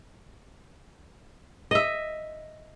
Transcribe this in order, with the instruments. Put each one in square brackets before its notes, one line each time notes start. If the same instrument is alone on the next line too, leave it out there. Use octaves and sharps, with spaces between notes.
[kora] D#5 E5